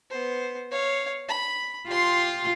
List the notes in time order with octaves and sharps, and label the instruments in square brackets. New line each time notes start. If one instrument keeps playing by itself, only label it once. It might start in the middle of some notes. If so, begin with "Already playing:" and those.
[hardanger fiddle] B3 C5
C#5 F5
B5
[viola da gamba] F4 [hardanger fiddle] G4 C6